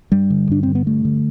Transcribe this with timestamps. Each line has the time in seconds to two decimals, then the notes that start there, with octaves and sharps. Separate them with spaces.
0.12 G2 G3
0.30 D3
0.49 G2 D4
0.63 D3 C4
0.75 B3
0.86 G2 A3
1.05 D3